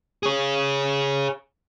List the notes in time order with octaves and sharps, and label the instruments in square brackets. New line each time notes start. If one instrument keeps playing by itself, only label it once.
[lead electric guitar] G#4 C#5